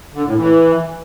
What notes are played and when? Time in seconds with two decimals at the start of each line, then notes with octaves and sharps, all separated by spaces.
0.14 D3
0.25 A2
0.37 E3